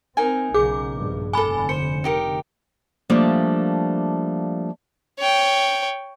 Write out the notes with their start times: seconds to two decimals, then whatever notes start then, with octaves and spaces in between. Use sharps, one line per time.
0.17 C4 D#4 A#4 G#5
0.54 B1 C#3 G#4 D6
0.96 A#1 G2
1.33 F1 D3 A4 G#5 B5 D6
1.69 C5 C#7
2.04 D#4 G4 A#4
3.10 F3 G3 A3 A#3 D4
5.19 C#5 G5